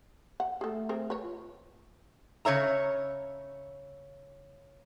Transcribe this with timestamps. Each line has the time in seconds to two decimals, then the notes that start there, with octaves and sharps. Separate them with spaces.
0.40 F#5
0.61 A3 G#4 A4
0.89 C4 G#4 A#4
1.10 B4 C#5
1.24 F4
2.45 C#3 C#5 E5 A#5